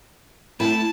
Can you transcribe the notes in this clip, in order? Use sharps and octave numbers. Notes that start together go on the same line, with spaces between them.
A3 E4 G5 A5